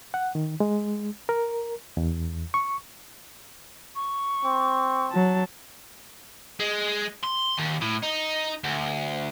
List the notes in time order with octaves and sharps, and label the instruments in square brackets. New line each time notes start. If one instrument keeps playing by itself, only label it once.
[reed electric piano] F#5
D#3
G#3
A#4
E2
C#6
[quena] C#6
[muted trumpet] C4
[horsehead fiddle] F#3 A5
[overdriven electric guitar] G#3
C6
D#2
A2
D#4
D2